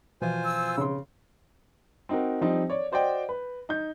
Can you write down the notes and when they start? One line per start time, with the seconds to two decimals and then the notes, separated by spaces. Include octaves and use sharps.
0.22 B2 E3 F3 F4 C5 G#5
0.44 E6
0.77 C#3 C6
2.09 C4 D#4 F#4 A#4
2.41 F3 G3 C4 D#4
2.70 C#5 D5
2.92 F#4 C5 D5 D#5 G5
3.29 B4
3.69 D#4 G6